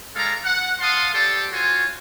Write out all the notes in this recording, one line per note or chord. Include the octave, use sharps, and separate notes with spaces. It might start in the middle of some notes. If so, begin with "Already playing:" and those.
G#3 A4 D5 F5 A#5
F#5
F5 F#5 A5 C6 D#6
G4 A4 C5 D5 A5
F4 F#4 C5 C#5 G#5